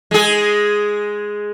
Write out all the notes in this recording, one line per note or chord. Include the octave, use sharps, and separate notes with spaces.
G#3 G#4